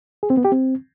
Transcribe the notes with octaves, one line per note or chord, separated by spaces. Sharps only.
G#4
C4
B3
G4
C4